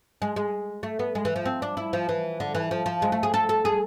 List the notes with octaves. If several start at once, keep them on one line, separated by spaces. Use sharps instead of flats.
G#3
G#3
A3
B3
G#3
E3
F3
C4
D4
E4
F3
E3
D3
E3
F3
F3
G#3
A3
G#4
A4
A4
G#4